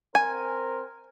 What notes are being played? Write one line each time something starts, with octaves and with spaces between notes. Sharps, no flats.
C4 A#4 C5 G#5